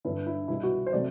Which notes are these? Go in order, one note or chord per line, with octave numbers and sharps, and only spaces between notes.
G1 G2 D3 E4
E4
C2 B2 G3 E4
F#4
C5
C3 F#3 A3 D5